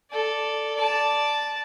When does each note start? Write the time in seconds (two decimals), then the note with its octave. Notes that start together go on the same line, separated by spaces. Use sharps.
0.11 A4 D5
0.76 D5 A5